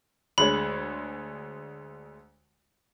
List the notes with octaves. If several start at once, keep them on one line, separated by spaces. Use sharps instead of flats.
D2 G#3 C#5 B5